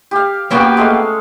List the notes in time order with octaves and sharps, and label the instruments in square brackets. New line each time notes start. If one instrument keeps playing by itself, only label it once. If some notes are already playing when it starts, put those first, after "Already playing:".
[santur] G4 F5
[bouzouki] A#3 B3 G5 [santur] C#4 F#4 G4
[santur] G#3 A3 F5